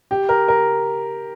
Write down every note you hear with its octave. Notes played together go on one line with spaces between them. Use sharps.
G4
A#4
A#4